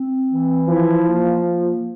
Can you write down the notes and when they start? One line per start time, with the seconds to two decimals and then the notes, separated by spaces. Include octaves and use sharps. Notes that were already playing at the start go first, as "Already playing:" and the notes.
Already playing: C4
0.31 E3
0.69 F3 E4
1.07 A#3
1.43 A#3